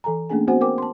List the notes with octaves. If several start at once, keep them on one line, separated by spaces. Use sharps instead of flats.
E3 A4 G#5 A#5
A3 A#3 C#4 D4 G#4 G#5
B3 C4 F#4 C5 F#5 G#5
A#4 C5 G5 G#5 D6
A5 C6